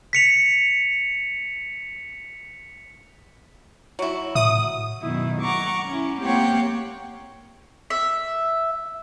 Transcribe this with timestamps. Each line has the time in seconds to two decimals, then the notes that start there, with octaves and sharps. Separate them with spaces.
0.13 B6 C#7 F7
3.99 F#3 E4
4.35 A2 E5 D#6
5.02 F#2 B2 D#3 E4
5.41 F#5 A#5 C#6 D6
5.86 C#4 E4
6.23 A#3 C4 G4 C#5 F#5 G5
7.90 E5